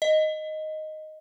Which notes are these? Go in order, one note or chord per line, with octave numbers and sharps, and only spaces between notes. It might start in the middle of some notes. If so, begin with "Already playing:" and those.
D#5